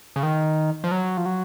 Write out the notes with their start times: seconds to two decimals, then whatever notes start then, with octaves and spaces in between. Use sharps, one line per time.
0.16 C#3
0.23 D#3
0.84 F3
0.91 F#3
1.17 F3
1.26 F#3